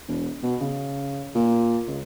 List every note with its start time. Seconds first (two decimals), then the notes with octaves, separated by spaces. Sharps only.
0.08 E1
0.43 B2
0.61 C#3
1.35 A#2
1.87 C#2